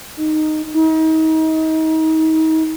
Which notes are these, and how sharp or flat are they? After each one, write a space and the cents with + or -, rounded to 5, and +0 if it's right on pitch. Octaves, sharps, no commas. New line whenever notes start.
D#4 -10
D#4 +35